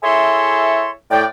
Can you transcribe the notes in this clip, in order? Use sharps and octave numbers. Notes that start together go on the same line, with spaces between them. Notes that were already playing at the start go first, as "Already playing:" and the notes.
E4 G#4 A4 C#5 E5 C6
A2 D5 G5